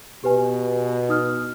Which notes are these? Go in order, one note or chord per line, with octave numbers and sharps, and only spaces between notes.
B2 G4 B4 G#5
D#4 D#6 F6